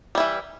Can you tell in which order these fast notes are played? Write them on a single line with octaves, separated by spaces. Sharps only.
G3 E4 E3